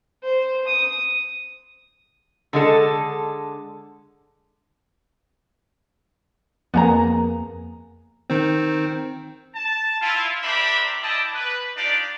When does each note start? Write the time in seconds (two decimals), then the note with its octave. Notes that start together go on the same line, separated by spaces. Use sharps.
0.23 C5
0.67 D#6
2.53 D3 G#3 A4
6.74 F2 A#3 B3 G#4 A#5
8.30 D#3 C4
9.55 A5
10.02 E4 F4
10.42 D4 G4 A#4 C5 E5 B5
11.02 E4 D5 D#5 G5 A5
11.34 B4
11.76 D4 D#4 F4 G4 D5